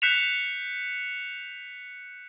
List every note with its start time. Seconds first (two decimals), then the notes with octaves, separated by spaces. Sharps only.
0.02 F#6 G6 B6 C#7 E7 F7